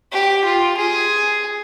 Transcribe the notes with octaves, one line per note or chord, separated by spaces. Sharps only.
G4
F4
G#4